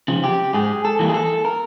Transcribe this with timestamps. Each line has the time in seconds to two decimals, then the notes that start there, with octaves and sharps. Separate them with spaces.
0.08 C#3 F3
0.24 G4
0.54 G#2 G#4
0.85 A4
0.99 E3 G3 A#3
1.09 G#4
1.14 A4
1.45 A#4